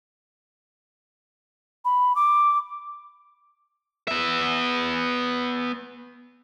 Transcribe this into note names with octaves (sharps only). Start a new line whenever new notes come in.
B5
D6
B3 E5